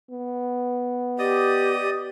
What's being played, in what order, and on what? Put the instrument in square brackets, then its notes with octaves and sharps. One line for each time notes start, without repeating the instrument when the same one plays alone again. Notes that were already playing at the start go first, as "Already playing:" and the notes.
[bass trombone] B3
[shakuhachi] G4 [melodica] D5 D#5 D#6